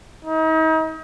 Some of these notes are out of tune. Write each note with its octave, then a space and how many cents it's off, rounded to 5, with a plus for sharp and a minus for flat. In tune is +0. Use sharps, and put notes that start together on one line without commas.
D#4 +40